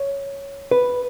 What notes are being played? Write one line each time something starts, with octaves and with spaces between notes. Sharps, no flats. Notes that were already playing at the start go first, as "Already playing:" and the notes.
Already playing: C#5
B4